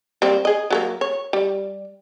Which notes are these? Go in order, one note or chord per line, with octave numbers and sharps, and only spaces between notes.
G3 A#3 C4
G#4 D#5
F#3 A3 A#3
C#5
G3